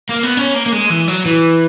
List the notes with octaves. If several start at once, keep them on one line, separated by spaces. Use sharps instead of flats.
A#3
B3
C#4
A#3
A#3
G#3
E3
F#3
E3